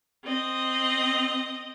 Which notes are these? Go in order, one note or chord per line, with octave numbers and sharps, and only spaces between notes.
C4 D#5